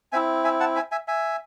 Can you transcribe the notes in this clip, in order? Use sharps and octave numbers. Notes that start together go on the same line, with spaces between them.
C4 E4 E5 G#5
E5 G#5
F#5 A5
E5 G#5
E5 G#5
E5 G#5